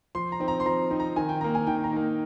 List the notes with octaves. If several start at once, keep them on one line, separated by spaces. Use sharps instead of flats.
F3 C6
A#5
C4 D#4
A#5
C6
F3 A#5
C4 D#4
A#5
D#3 G#5
G5
A#3 D#4 A#5
G#5
D#3 G5
A#5
A#3 D#4